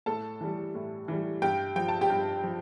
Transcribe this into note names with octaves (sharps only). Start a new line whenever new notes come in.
A2 A4 A5
E3 G3
A2
E3 G3
G2 G4 G5
F3 G5
A5
G4 G5
G2
F3